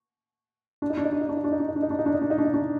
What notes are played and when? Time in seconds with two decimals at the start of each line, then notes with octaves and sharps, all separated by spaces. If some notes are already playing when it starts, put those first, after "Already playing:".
0.82 D4
0.90 D#4
0.97 D4
1.05 D#4
1.12 D4
1.21 D#4
1.29 D4
1.37 D#4
1.44 D4
1.52 D#4
1.60 D4
1.68 D#4
1.76 D4
1.83 D#4
1.90 D4
1.99 D#4
2.06 D4
2.14 D#4
2.21 D4
2.30 D#4
2.38 D4
2.45 D#4
2.54 D4